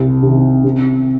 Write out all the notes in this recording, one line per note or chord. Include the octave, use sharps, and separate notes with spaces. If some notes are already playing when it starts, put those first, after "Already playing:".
Already playing: C2
C3 D#3
C3